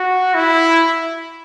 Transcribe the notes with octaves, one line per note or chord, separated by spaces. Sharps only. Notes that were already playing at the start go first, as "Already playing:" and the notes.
Already playing: F#4
E4